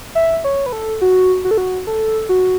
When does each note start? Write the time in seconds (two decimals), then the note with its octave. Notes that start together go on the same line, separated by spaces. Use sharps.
0.15 E5
0.44 C#5
0.66 B4
0.73 A4
1.01 F#4
1.45 F#4
1.51 A4
1.58 F#4
1.87 A4
2.29 F#4